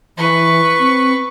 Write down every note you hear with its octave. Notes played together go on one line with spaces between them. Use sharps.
E3 B4 C#6
C4